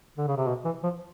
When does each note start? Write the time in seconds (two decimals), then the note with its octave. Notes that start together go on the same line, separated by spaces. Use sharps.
0.17 D3
0.27 C#3
0.37 C3
0.47 B2
0.65 E3
0.83 F3